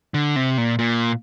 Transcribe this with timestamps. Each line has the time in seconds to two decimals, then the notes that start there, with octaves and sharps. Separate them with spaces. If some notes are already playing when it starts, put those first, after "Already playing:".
0.14 D3
0.36 C3
0.58 A#2
0.79 A#2